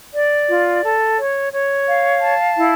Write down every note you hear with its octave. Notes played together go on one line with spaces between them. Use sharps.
D5
F4
A4
C#5
C#5
F5
A5
E4